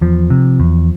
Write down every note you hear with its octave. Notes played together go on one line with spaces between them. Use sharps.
E2 F3
C3
E2